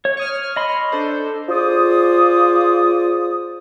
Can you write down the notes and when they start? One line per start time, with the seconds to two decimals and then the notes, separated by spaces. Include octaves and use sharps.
0.05 C#5
0.17 C#6 D#6 F6
0.56 D#5 B5 C6
0.92 D4 A4 C5
1.49 F4 G#4 C5 D5 D#6